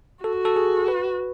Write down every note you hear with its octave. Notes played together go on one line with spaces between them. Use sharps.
F#4 A4
A4
G#4
B4